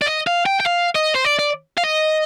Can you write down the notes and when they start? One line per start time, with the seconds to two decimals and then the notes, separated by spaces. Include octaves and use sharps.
0.02 D5
0.06 D#5
0.27 F5
0.46 G5
0.60 G5
0.66 F5
0.95 D#5
1.15 C5
1.25 D5
1.39 D5
1.78 F5
1.84 D#5